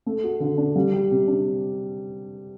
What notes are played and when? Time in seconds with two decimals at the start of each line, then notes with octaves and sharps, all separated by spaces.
0.06 A3
0.24 F#4
0.40 D3
0.57 D4
0.76 G3
0.93 G4
1.11 C3
1.27 D4